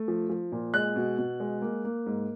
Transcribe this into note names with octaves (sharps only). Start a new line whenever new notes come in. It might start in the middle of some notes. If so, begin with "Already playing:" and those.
Already playing: A3
F3
F3
A#2
G#3 F#6
B2
B2
G#3
A#3
A#3
G#2